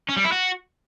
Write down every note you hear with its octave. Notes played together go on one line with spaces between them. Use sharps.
C#4
G3
E4
F#4